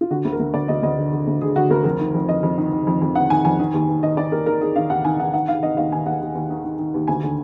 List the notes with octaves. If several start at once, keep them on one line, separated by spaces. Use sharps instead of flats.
F4
D3 F#4
D2
A#4
D2
D2 D5
D2 D#5
D2 D#5
D3
D3
D2
D3 G#4
D3 F#4
D2 A#4
F2 A#4
D#3
F2
F2 D#5
F2
D#3
D#3
F2
F2
D#3 F#5
D#3 G#5
F2 G#5
D#3
D#2
D#2
D#3 D#5
D#3 D5
D#2 A#4
D#3 A#4
D#3 G#4
D#3 F5
D#2 F#5
D#3 G#5
D#3 F#5
D#3 F#5
D#3 F5
D#3 D#5
D#2 F5
D#3 G#5
D#2 F#5
D#2
D#2
D#3
D#3
D#3
D#2
D2 G#5
D3